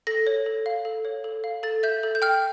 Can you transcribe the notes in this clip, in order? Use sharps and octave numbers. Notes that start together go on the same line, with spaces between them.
A4 A#6
C#5
A4
F5
A4
C#5
A4
F5
A4 A6
E5 G6
A4
G6
G5 F6